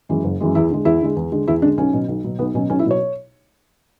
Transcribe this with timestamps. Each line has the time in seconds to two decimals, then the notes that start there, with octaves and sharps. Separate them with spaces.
0.09 F#2 E3 G#3
0.24 F#1
0.40 F#2 E3 G#3
0.55 E2 E4
0.70 D3 G#3
0.85 E2 E4
1.01 D3 G#3
1.16 E2
1.32 D3 G#3
1.48 E2 E4
1.62 D3 G#3 D4
1.78 B1 C#4
1.93 B2 F#3
2.08 B1
2.24 B2 F#3
2.39 B1 B3
2.54 B2 F#3 C#4
2.70 B1 C#4
2.79 E4
2.86 B2 F#3 C#5